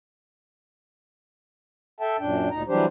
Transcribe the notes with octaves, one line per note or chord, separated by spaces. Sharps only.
A4 E5 G5 A5
F#2 A#2 D4 G5
D2 A#2 D#4 A#5
E3 F#3 G3 D4 G4 C5